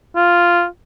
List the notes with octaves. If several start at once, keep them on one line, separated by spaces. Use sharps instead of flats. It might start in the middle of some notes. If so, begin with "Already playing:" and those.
F4